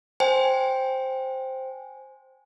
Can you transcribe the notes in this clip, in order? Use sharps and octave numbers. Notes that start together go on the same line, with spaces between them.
C5 G5 G#5